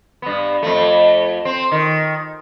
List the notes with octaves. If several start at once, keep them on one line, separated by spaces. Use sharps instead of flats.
G2 B3
F2 A3
C4
D#3